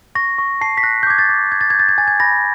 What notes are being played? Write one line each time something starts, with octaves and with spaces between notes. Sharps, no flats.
C#6 A#6
C#6
A5 C7
B6
F#6 A#6
G6
D6 G#6
A6
D6
G6 G#6
A6
G6 G#6
A6
G#6
G#5 A6
G#6
B5 A#6